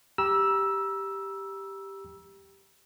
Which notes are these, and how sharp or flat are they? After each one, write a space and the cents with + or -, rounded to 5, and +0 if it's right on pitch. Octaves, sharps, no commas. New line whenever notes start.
G4 +0 A#5 +40 E6 +0